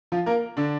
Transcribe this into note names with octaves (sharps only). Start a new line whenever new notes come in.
F3 F4
A#3 A#4
D3 D4